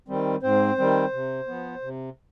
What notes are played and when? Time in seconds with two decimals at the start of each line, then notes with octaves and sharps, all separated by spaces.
0.08 D#3 G3 C4
0.43 G#2 C4 C5
0.78 D#3 G3 C4
1.13 C3
1.47 F3 B3
1.82 C3